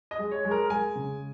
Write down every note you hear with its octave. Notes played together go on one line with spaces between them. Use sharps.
D#5
G#3
C#5
G#3
A#4
G#3 G#5
C#3